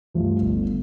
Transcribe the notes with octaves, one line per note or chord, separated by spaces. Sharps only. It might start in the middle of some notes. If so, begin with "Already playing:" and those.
G2 F3 A3
G1